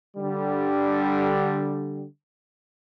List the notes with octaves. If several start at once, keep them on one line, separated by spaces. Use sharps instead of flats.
D3 G3